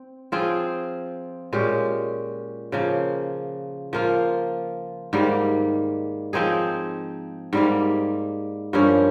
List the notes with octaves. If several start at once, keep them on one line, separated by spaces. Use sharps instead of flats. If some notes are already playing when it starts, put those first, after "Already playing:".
Already playing: C4
F3 C4 F4 G#4
A#2 G#3 C#4 G4
C#3 F3 A#3
F3 A#3 F4
G#2 D#3 G3 A#3
F3 C4 D#4 G#4
G#2 G3 A#3
G2 F3 A#3 C#4